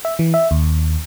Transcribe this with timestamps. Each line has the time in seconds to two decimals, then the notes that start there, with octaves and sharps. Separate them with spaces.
0.05 E5
0.19 E3
0.34 E5
0.51 D#2